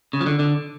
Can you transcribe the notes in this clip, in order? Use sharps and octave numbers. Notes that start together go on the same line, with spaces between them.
C#3
F3
D3
D3